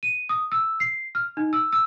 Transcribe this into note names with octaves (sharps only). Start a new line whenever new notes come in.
D#7
D#6
E6
C7
F6
D#4
E6
E6